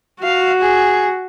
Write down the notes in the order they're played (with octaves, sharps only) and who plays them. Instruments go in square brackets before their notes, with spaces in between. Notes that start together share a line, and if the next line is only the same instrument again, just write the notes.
[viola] F#4 [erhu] F5
[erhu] G#4